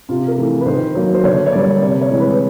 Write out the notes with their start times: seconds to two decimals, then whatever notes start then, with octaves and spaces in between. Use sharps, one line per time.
0.09 C3 F4
0.27 A#4
0.37 E3 A3
0.61 B4
0.66 D#3 C5
0.95 F#3 A#3
1.14 C5
1.24 D3 C#5
1.46 C#5
1.52 G3 A#3 D5
1.82 C3 C#5
2.01 C#5
2.10 E3 G#3
2.20 B4